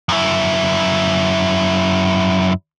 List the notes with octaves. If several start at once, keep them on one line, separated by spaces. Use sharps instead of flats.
F#2 E4